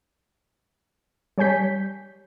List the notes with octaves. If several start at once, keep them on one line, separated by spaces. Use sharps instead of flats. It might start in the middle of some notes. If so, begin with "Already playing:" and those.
G3 C#5 G#5 G6 B6